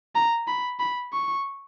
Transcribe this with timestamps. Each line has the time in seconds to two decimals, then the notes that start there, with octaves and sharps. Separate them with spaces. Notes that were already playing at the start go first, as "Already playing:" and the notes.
0.15 A#5
0.48 B5
0.80 B5
1.13 C#6